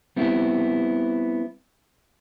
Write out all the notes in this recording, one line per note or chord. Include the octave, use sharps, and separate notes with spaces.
G3 B3 C4 E4